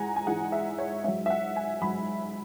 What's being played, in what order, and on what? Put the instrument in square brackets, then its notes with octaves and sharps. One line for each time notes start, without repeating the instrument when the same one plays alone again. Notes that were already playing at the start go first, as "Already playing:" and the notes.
Already playing: [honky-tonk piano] G#2 E3 G#3 F#5 G#5 A#5
G#5
G#2 E3 G#3 F#5
E5
C#5
G#2 F#3 E5
E5
F#5
G#5
G#2 F#3 B5